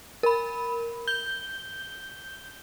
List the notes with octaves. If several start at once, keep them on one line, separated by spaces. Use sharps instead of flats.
A#4 B5
G6 G7